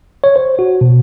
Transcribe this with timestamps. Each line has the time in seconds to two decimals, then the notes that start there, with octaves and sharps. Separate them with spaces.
0.24 C#5
0.36 C5
0.59 F#4
0.81 B2